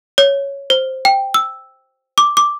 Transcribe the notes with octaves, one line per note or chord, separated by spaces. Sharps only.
C#5
C5
G5
E6
D6
D6